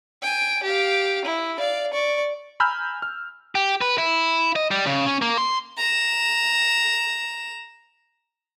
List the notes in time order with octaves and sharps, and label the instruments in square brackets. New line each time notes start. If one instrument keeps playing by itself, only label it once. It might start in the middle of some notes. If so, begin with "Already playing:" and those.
[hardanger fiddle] G5 G#5
G4 F5
E4
D5 F5
D5 C#6
[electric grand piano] G#5 A#5 B5 E6 F6 G6
F6
[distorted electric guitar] G4
B4
E4
D#5
G3
C#3
C#4
A#3
C6
[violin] A#5 E7